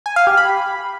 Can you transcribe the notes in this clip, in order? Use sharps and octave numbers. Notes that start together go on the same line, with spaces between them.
G#5
F5
G4
B5